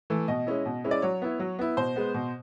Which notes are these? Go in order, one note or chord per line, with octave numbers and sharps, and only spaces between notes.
E3 A3
B2 D#5
G#3 C#4 E4
B2
G#3 C#4 E4
D5
F#3 C#5
B3 E4
F#3
B3 E4
B2 C5
G#3 B3
B2